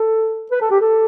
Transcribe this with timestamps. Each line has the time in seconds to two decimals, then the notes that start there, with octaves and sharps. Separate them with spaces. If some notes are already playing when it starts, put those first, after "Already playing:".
Already playing: A4
0.51 B4
0.61 A4
0.71 G4
0.81 A4